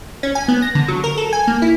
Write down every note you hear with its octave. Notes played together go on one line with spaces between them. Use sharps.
C#4
G#5
B3
A#6
D3
F#3
A#4
A4
G#5
A#3
E4